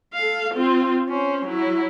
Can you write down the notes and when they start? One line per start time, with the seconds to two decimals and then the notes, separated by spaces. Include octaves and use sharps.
0.14 A4 F5
0.53 C4 F4
1.08 C#4 C5
1.45 F#3 E4